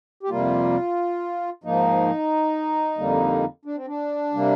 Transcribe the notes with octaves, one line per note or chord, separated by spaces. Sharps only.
G4
F2 C3 G3 A#3 F4
G#2 F3 A#3 D#4
F2 D3 G3 A#3
D4
C4
D4
C3 G3 A#3